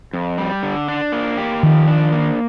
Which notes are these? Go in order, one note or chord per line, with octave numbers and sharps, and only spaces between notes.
F2
G3
D3
D4
A#3
G4
D#3 F3
D4
A#3